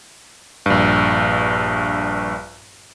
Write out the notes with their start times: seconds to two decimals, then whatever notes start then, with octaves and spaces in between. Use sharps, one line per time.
0.66 A#1 G2